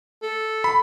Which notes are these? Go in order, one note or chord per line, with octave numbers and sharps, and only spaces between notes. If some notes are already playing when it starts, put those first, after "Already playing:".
A4
B5